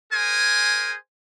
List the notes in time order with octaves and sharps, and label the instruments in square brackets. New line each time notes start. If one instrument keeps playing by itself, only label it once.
[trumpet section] G#4 A#4 C5 G#5